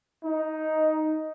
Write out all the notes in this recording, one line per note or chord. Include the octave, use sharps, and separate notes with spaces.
D#4